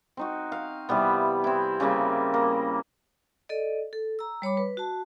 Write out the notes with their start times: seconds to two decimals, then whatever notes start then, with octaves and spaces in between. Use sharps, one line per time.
0.17 C4 D#4 F#4
0.52 F5
0.89 C3 E3 G3 B3
1.44 C4 E4
1.80 C#3 G3 A#3 C4
2.34 A#3
3.49 A4 D5 D#5
3.93 A4
4.19 A#5 E6
4.42 G3 C#5 B5 D6
4.57 B4
4.77 F#4 A5